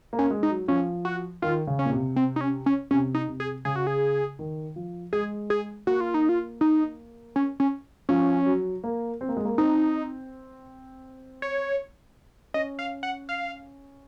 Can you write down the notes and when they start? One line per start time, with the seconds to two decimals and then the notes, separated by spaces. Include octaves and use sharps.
0.13 A#3
0.19 C#4
0.30 G#3
0.43 D#4
0.49 F#3
0.68 F3 C#4
1.05 F#4
1.42 D#3 F4
1.67 C#3
1.79 C#4
1.86 A#2
1.92 C3
2.16 C4
2.36 D#4
2.41 C#4
2.66 C#4
2.91 C3 C#4
3.15 D#4
3.28 C3
3.40 G#4
3.65 C#3 G#4
3.76 F#4
3.87 G#4
4.39 D#3
4.76 F3
5.13 G#3 G#4
5.50 G#4
5.87 A#3 F#4
6.01 F4
6.14 D#4
6.29 F4
6.61 D#4
7.36 C#4
7.60 C#4
8.09 F3 C#4
8.46 F#3
8.84 A#3
9.21 C4
9.29 A#3
9.37 G#3
9.45 A#3
9.58 C4 D#4
11.42 C#5
12.54 C#4 D#5
12.79 F5
13.03 F#5
13.29 F5